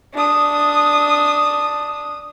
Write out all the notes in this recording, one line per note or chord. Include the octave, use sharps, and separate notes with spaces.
D4 D#6